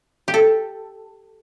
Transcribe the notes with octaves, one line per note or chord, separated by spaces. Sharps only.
G4
A4